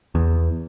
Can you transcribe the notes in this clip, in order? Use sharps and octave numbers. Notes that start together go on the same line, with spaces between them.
E2